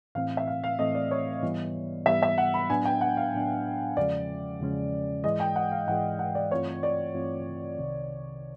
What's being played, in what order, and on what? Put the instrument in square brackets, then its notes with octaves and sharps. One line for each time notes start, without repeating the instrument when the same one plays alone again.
[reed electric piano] A2 E3 A3 C4 [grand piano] F5
[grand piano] E5
F5
F5
[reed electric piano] A2 E3 A3 C4 [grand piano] D#5
[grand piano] D5
C#5
[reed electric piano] G#2 E3 G3 B3
[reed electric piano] G#2 E3 G3 B3 [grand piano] E5
[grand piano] E5
F#5
B5
[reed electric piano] A2 F#3 B3 D4 [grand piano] G#5
[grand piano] G5
F#5
F5
[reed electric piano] A2 F#3 B3 D4
[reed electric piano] E2 C#3 F3 G#3 C#4 [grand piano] D5
[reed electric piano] E2 C#3 F3 G#3 C#4
[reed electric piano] G#2 E3 G#3 [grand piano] D#5
[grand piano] G5
F#5
F5
[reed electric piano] G#2 E3 G#3 [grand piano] F#5
[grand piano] F#5
D5
[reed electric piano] G2 E3 A3 C4 F4 [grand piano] C#5
[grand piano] D5
[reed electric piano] G2 E3 A3 C4 F4
C2 C3 D#3